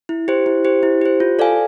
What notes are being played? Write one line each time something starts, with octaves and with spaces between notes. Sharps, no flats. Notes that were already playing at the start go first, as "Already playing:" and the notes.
E4
G4 C5
E4
G4 C5
E4
G4 C5
F4
A4 D5 F5 G#5